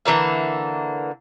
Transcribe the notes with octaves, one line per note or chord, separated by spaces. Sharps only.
D3 E3 A#3 E5